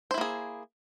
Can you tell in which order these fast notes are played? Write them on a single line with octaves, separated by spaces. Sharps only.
C5 E4 A#3 G#4